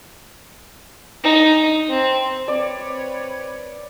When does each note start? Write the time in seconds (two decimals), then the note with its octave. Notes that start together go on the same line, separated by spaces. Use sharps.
1.24 D#4
1.89 C4
2.48 C4 B4 C#5 D5